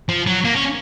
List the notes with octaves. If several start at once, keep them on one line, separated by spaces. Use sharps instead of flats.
F3
F#3
A#3
C#4